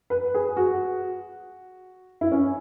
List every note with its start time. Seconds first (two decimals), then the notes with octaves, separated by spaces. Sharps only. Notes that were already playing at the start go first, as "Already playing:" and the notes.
0.10 B4
0.34 G#4
0.57 F#4
2.21 E4
2.32 C#4